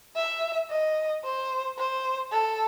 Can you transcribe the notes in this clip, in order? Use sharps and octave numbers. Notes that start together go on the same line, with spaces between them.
E5
D#5
C5
C5
A4